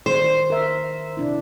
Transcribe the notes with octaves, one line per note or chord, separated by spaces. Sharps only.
D#3 C5
A#4 E5
C3 D4 E4